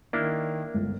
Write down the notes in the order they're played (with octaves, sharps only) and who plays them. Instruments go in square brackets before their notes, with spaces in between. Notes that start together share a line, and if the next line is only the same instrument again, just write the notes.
[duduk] D#3 [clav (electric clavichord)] A#3 D4 E4 [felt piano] F6
[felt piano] G1 C#2